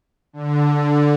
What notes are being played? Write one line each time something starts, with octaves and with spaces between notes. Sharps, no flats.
D3